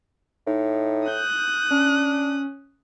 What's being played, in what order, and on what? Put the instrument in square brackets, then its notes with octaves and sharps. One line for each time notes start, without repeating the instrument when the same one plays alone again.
[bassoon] A2 [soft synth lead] D#4
[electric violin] D#6 F#6 [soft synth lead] G6
[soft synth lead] C#4 [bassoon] D4